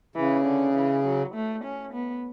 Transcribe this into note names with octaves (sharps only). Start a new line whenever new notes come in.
C#3 E3
D3
E3
F#3
A3
C#4
B3